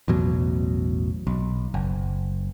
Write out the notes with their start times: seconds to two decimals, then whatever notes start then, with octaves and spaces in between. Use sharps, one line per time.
0.08 A1 E2 B2 F#3
1.27 B1
1.74 F#1